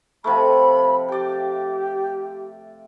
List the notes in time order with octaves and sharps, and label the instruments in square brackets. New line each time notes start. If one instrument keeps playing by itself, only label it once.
[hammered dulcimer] C3 F3 A3 [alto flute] B5
[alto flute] G4 [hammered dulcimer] D5 G5